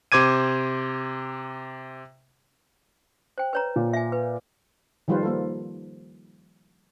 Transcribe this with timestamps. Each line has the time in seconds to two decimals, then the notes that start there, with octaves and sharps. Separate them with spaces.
0.12 C3 C5 D6 G#6 D#7
3.38 C5 G5
3.53 B4 C#5 A#5
3.76 A#2
3.93 E5 G#5
4.12 B4
5.08 D#3 F3 G3 F4 B4 C5
5.23 A#3 F4 A4